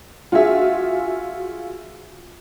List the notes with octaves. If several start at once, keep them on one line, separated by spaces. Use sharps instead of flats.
F4 F#4 G#4 E5